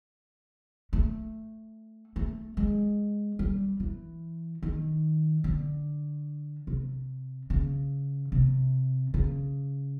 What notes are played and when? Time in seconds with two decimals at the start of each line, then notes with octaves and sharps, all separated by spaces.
0.93 A3
2.16 A3
2.57 G#3
3.39 G3
3.80 E3
4.63 D#3
5.44 D3
6.67 C3
7.50 C#3
8.32 C3
9.14 C#3